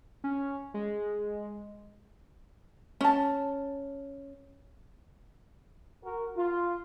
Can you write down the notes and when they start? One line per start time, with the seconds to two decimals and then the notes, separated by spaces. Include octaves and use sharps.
0.24 C#4
0.74 G#3
3.01 C#4 A5
6.03 F#4 A#4
6.36 F4